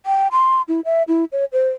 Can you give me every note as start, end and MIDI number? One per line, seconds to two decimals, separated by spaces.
0.06 0.28 79
0.32 0.62 84
0.68 0.81 64
0.85 1.03 76
1.08 1.25 64
1.32 1.45 73
1.53 1.70 72